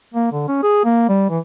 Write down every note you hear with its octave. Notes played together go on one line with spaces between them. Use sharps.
A#3
D3
C#4
G#4
A#3
G3
E3